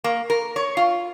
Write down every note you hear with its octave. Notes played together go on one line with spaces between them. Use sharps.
A#3
A#4
C#5
F4